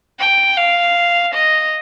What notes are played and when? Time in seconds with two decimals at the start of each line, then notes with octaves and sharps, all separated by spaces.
0.19 G5
0.57 F5
1.34 D#5